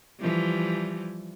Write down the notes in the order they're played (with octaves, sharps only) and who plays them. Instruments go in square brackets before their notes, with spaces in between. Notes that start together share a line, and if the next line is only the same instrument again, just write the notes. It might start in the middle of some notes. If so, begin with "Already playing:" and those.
[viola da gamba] E3 F3 G3